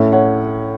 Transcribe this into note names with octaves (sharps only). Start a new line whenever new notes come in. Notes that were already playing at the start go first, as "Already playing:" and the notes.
Already playing: A2 A3 C#4
C#5 F#5